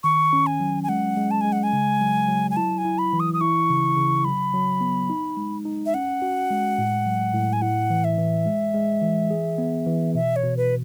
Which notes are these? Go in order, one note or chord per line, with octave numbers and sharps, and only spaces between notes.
D#3 C#6
C#4
G#5
F#3
G#5
G#3 F#5
G#3
A5
G#3 G#5
F#5
G#5
C#3
F#3
F#3
G#5
E4 A5
G#5
E4
B5
E3
D#6
D#6
E4 C#6
C#3
C#3
F#3 B5
F#3
B3
D#4
G#3
D#4
E5
C#4 F#5
F#4
G#3
A2
F#3
A2
G#5
E4 F#5
E3
E5
E3
G#3
G#3
E3
G#4
B3
E3
B2 E5
C#5
B2
B4